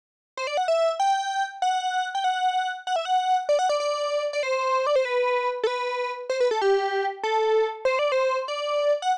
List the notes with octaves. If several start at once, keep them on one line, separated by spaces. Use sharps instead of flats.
C5
D5
F#5
E5
G5
F#5
G5
F#5
F#5
E5
F#5
D5
F#5
D5
D5
D5
C5
D5
C5
B4
A4
B4
C5
B4
A4
G4
A4
C5
D5
C5
D5
F#5